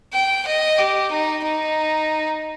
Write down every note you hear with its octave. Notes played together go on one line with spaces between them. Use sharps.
G5
D#5
G4
D#4
D#4